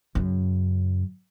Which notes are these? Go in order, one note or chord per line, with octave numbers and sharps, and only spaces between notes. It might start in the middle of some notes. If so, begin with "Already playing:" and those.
F#2 C#3